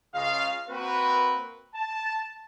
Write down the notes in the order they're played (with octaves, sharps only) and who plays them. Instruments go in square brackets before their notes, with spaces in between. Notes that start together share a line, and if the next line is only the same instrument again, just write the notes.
[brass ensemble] C#2 C#3 F4 D#5 F5
A#3 C4 F#4 A#4 B4
A5